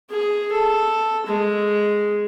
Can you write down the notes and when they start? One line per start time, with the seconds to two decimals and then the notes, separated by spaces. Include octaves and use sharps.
0.10 G#4
0.52 A4
1.27 G#3